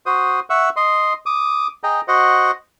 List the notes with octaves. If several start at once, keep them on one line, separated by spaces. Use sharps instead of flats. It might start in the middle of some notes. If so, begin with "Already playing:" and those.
F#4 C5 D#6
E5 F#5 C#6 E6
D#5 C6
D6 D#6
G#4 D#5 G5 A#5
F#4 C5 D#5 F#5